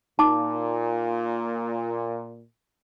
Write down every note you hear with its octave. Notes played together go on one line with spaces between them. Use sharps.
A#2 D#4 A5 D6